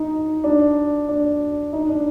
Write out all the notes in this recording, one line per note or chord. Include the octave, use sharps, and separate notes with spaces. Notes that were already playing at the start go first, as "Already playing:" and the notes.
Already playing: D#4
D4
D4
D#4
D4